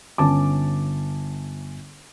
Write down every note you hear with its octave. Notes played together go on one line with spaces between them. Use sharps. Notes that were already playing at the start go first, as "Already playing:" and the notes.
G1 C#4 A5 D6